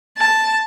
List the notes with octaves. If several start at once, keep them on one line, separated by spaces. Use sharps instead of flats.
A5